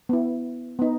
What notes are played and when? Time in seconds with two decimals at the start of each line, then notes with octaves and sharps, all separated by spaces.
0.09 B3 E4
0.79 B3 D#4